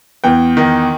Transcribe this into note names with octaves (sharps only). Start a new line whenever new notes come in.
E2 G5
D#3